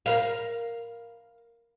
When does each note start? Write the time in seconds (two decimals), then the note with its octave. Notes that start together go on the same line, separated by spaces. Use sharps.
0.06 A#4 B4 F5